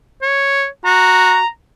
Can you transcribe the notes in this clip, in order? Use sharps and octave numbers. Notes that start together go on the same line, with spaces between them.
C#5
F#4 A#5